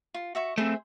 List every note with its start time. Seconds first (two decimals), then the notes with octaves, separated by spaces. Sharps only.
0.14 F4
0.35 F#4 E5 C#6
0.58 A3 C4 G#4 C5 E5